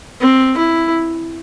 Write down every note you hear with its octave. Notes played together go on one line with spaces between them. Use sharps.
C4
E4